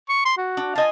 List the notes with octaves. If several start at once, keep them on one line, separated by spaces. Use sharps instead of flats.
C#6
C6
F#4
D4
F4 D#5 G#5 A5